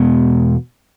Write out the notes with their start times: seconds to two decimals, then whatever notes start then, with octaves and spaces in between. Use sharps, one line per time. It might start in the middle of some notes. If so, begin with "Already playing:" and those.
Already playing: E2 B2 G#3 B3